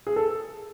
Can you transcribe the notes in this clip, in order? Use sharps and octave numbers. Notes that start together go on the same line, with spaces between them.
G#4
A4